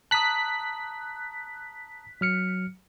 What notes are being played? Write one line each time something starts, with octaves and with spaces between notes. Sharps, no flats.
A5 A#5 D#6 F#6 B6
F#3 F6 C#7